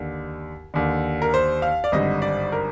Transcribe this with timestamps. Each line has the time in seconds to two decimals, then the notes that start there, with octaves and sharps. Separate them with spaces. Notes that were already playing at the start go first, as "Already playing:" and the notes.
Already playing: D#2 D3
0.74 D#2 D3
1.22 A#4
1.34 C5
1.62 F5
1.84 D5
1.92 G#1 G2 D3 D#5
2.22 D5
2.52 A#4